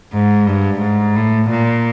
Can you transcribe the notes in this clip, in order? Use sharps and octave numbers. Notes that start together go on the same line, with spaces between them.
G#2
G2
G#2
A2
A#2